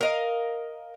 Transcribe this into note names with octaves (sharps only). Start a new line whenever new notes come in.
A#4 D#5 F5